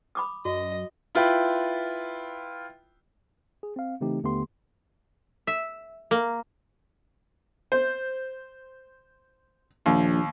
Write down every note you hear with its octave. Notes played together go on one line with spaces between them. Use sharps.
B5 D6 D#6
F#2 F#4 D#5
E4 F4 B4 G5 B5
G#4
C4 F5
C#3 E3 A3 C4 D#4 G4
D#2 D3 A3 B3 G4 C6
E5
A#3
C5
A#1 D#2